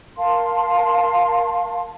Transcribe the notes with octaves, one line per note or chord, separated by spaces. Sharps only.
A#4 F5 A5 C6